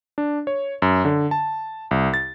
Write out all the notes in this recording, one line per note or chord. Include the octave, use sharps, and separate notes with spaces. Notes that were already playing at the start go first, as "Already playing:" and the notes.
D4
C#5
F#2
D3
A5
C2
A6